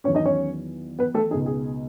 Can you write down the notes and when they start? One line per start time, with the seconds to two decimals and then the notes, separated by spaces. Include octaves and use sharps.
0.04 E2 D#3 F#3 B3 C#4 C#5
0.15 D#4 D#5
0.26 C#4 C#5
0.99 B3 B4
1.14 A3 A4
1.31 C#2 B2 G#3 D#4 G#4
1.46 G#4